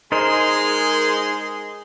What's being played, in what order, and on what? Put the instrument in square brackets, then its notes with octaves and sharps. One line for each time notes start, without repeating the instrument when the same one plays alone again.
[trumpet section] G#3 G#4 C6 [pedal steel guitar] D#4 A#4 C5